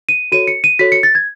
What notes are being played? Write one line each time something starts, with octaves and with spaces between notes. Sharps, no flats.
D#7
F#4 A4 C#5 D#7
C#7
D#7
F#4 A4 C#5 B6
C#7
A6
G#6